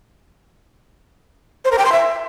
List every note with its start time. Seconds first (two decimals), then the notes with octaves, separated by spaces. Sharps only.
1.65 C5
1.72 A#4
1.78 G5
1.85 C6
1.92 E5